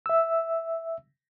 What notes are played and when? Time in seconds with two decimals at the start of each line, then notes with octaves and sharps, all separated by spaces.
0.06 E5 E6